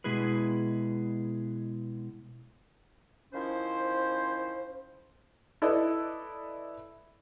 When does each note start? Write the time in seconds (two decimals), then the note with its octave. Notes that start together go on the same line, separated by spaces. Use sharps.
0.04 B2 G#3 E4 G#4 B4
3.34 D#3 F3 C#4 E4 C5
5.62 E4 A4 B4 D5 D#5